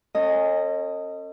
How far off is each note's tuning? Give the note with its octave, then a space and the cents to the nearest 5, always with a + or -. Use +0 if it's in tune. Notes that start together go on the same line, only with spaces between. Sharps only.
C#4 -25 A4 +45 D#5 +0